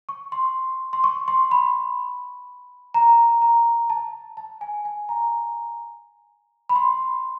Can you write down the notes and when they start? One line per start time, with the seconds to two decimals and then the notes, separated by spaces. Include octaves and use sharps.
0.09 C#6
0.32 C6
0.93 C6
1.04 C#6
1.28 C6
1.51 B5
2.94 A#5
3.42 A#5
3.90 A5
4.37 A5
4.61 G#5
4.85 G#5
5.09 A#5
6.69 B5
6.76 C6